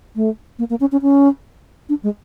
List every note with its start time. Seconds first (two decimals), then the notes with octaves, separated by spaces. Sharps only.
0.16 A3
0.59 A#3
0.70 A#3
0.80 C#4
0.92 C#4
1.02 C#4
1.89 D4
2.03 G#3